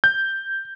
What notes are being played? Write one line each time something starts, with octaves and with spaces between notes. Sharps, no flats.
G6